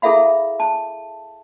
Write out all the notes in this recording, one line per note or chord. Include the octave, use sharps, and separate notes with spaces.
E4 G#4 A4 E5 F5 B5
A5